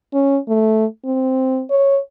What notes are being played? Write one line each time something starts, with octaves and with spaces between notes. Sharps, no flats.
C#4
A3
C4
C#5